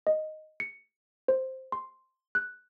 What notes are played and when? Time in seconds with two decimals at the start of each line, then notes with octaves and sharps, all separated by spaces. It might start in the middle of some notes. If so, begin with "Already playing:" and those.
0.07 D#5
0.60 C#7
1.28 C5
1.72 C6
2.35 F#6